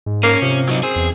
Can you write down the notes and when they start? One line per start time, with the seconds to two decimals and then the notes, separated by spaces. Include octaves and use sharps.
0.06 G#2
0.23 A#3 C#4
0.42 C3 F3
0.69 F#3 D#4
0.83 C4 G#4
0.96 E2